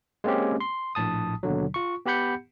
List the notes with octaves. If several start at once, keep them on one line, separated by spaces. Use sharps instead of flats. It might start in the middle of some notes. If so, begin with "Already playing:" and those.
G#3 A#3 C4 C#4 G4
C6
A#1 A2 A5 D#6
D#2 B2 D3 F#3
F4 C#6
B3 G4 F#5 B5 G6 C#7